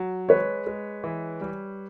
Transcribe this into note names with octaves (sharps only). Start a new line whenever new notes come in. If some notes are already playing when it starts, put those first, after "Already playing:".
Already playing: F#3
G#3 B4 C#5
G#3
E3
G3